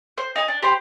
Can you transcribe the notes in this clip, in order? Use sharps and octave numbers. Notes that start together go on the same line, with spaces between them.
C5
D#4 G#5
D4
G4 C5 B5 C6